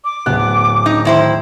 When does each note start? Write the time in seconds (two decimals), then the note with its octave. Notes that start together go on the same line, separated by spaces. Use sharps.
0.05 D6
0.26 D1 B3 F#6
0.86 D#4
1.05 D#3 E4 C5